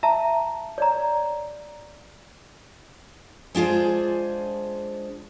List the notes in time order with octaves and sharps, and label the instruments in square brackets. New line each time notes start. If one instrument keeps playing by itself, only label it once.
[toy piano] E5 A5 A#5
C#5 D5 A#5
[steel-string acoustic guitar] G#3 D4 F4 G#4 C5